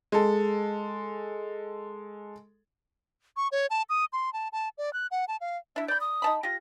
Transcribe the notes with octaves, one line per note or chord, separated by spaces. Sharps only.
G#3 A4
C#6
C#5
A5
D#6
C6
A5
A5
D5
F#6
F#5
A5
F5
D4 E4 E5
D5 B5 G6
D#6
D#4 A5 B5
F4 G4 A#6